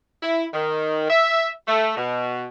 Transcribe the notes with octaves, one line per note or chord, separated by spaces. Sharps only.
E4
D#3
E5
A3
B2